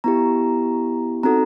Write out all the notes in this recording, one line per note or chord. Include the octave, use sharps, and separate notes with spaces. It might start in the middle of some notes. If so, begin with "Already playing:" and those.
B3 E4 G4 A#5
C4 D#4 F#4 A4 A#5